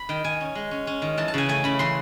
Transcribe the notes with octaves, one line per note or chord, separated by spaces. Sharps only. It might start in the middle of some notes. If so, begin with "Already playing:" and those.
Already playing: B5
D#3 G5
D#3 G#5
C#4
G#3
C#4
C#4
D#3
E3 A5
A5
C#3 G#5
A3 G#5
C#3 B5
E3 C6